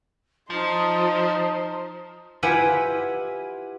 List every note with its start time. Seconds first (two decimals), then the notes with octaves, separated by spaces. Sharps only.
0.50 F3 D#4 C5 A5 C6 D#6
2.43 E4 F4 G4 B4 F#5 G#5